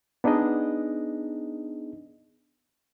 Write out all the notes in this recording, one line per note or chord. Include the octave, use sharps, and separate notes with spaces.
B3 D4 D#4 G#4 D#5